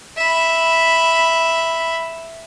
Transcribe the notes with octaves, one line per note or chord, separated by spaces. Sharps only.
E5 B5